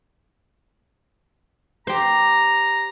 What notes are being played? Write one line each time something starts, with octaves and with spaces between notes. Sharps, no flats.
G4 C5 A#5